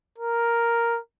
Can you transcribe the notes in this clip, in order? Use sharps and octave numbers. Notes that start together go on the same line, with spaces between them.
A#4